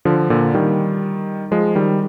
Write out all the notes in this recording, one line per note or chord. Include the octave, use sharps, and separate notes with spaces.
D3 F3
A#2 D3
D#3 G3
F3 G#3
D#3 G3